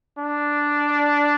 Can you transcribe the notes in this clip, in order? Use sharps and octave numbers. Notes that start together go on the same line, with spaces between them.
D4